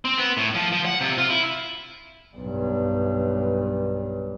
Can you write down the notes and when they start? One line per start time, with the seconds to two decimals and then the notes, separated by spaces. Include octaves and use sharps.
0.05 C4
0.18 B3
0.37 A2
0.55 F3
0.72 F3
0.85 F#5
1.01 C3
1.18 F4
1.30 E4
2.37 B1 G2